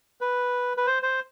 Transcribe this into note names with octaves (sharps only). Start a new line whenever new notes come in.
B4
B4
C5
C5